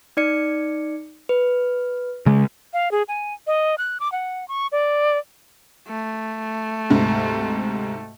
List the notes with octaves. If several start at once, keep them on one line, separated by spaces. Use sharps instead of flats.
D#4 D5 C#7
B4
C#3 G#3
F5
G#4
G#5
D#5
F#6
D6
F#5
C#6
D5
A3
D2 G#2 C3